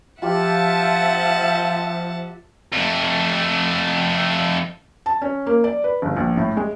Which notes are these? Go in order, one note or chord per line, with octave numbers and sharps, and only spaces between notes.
F3 F4 G4 E5 F#5 A5 C6
F2 A3
A5
C#4
A#3
D5
B4
G1
A#1
A2
G#3